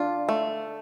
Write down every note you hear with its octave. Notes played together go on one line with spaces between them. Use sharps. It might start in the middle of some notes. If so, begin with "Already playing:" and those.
Already playing: D4 F4
A3